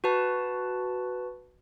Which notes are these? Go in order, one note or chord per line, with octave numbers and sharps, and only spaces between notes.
F#4 B4 A5